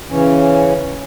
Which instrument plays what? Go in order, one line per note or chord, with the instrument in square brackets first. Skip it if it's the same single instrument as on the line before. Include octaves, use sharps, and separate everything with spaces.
[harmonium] C#3 E3 C#4